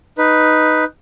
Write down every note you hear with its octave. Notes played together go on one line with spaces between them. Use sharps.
D#4 B4